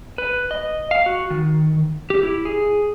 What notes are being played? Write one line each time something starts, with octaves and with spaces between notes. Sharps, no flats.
B4
D#5
F5
F#4
D#3
G4
E4
G#4